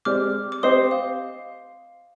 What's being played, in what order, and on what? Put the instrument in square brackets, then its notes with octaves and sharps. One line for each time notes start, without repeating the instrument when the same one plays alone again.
[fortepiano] G#3 C4 G4 D5 [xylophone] D6 F6
[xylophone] D6
[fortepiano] C4 G4 C5 D#5 [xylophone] C6 D#6
[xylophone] F5